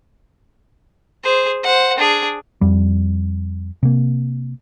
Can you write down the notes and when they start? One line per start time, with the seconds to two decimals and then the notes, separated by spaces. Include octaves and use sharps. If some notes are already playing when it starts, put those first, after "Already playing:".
1.24 G#4 C5
1.63 C5 F#5
1.98 D4 G#4
2.61 F2 G3
3.83 C3 A#3